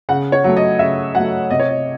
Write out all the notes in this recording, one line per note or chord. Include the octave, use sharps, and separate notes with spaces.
C#3 F#5
C#5
F#3 A3
D#5
C#3 E5
F#3 A3 F#5
C3 D#5
C#5
D#5